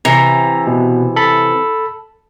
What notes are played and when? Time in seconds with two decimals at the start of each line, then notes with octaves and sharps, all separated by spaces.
0.05 C3 E3 A#5
0.67 B2
1.16 A4 B5